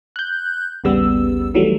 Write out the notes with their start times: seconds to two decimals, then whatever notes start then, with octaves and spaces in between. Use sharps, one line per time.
0.16 F#6 G6
0.84 A1 D#2 C#3 G3 B3 E6
1.54 D#3 E3 F#3 G3 A3